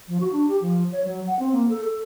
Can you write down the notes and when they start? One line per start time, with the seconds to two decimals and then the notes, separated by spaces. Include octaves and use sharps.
0.08 F3
0.20 F#4
0.33 D4
0.48 G4
0.62 F3
0.92 C#5
1.04 F#3
1.27 F#5
1.39 C4
1.53 A#3
1.69 A4
1.84 A4